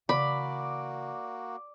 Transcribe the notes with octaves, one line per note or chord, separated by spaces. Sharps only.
C#3 E3 A#3 F#4 D5 B5